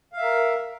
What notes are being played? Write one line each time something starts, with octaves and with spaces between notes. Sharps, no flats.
A#4 E5 F5